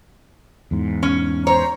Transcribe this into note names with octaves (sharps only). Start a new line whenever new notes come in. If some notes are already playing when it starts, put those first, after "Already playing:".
E2 G#2
C#4
C5 C#5 A#5